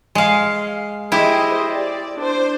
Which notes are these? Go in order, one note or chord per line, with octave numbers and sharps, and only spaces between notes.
G#3 F5
E4 G4 G#4 C5 D#5
D5
D4 C5